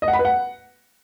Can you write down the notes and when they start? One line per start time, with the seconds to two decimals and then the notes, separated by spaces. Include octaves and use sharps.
0.02 D#5
0.08 F#5
0.13 B5
0.19 B4
0.25 F#5